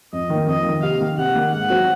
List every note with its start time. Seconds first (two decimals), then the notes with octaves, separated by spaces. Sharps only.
0.12 F2 D#5
0.30 D#3 A#3
0.47 F2 D#5
0.65 D#3 A#3
0.82 C3 F5
1.00 D#3 A#3
1.18 C3 F#5
1.35 D#3 A#3
1.53 G#2 F#5
1.70 F#3 C4 F#4